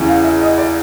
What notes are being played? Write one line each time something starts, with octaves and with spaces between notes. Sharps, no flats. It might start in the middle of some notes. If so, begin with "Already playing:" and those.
Already playing: E2 C#3 E3 G3
F5
E5
D#5
D5